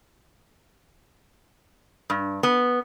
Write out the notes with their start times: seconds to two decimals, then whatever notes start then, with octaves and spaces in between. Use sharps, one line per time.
2.10 G2
2.43 B3